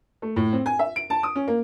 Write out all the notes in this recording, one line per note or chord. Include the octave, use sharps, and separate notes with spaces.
A3
A2
C4
G#5
E5
D7
A5
D#6
C#4
A#3